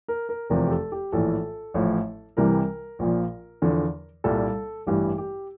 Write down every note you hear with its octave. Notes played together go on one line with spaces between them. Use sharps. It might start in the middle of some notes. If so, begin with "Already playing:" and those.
A#4
A#4
F1 E2 C3 F3 A#4
G4
A4
G4
A#1 A2 E3 A4
A1 A2 F3
C2 C3 E3 G3 A#4
A#1 A#2 F3
E2 D3 F3
C2 A#2 G3 A4
A1 G2 E3 G3 G4
G4